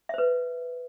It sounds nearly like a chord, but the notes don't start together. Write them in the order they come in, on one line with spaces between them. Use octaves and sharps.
E5 C5 B4